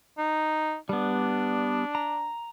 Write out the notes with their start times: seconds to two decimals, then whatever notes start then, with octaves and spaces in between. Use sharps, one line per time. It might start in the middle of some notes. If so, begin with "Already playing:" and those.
0.18 D#4
0.89 G3 B3 D4
1.95 A#5